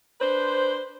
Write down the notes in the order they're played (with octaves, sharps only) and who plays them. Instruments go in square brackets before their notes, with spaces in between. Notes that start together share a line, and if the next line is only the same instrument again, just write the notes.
[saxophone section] D4 B4 C5